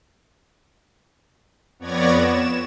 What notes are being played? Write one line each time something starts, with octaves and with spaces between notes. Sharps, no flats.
F2 B3 C#5 D5 G#6 A#6
E7